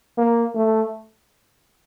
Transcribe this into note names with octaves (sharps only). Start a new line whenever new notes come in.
A#3
A3